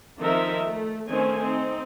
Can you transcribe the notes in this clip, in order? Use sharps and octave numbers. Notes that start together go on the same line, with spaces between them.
D#3 F3 C4 D#4 A#4 E5
A3
D#3 A3 C4 C#4 C5 G#5
C4 D#4